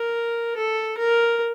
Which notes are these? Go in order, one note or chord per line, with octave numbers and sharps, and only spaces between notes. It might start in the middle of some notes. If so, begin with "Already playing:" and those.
Already playing: A#4
A4
A#4